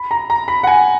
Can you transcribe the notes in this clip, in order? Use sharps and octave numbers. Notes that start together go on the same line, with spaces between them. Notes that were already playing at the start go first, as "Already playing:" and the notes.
Already playing: B5
A#5
A#5
B5
F#5
G#5